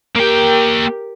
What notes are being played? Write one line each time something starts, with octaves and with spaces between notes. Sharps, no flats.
A#3 G4 A#4 G5